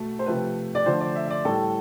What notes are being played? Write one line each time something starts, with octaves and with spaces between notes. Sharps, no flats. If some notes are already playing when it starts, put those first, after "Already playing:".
Already playing: B2 A3
C5
C3 F3 A3 B4
D5
D3 F3 A3 C5
D5
E5
E5
D5
A2 G3 A4